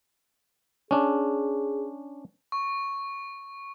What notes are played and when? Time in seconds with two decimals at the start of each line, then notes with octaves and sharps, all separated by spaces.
0.91 C#4 D4 G#4
2.52 C#6